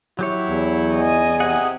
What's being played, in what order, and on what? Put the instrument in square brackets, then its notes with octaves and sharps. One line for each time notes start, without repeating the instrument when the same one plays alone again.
[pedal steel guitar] F#3 G4 C#5 [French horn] E4
[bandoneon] E2
[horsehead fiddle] D#5 G#5
[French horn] C3 [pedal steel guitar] G#4 F#5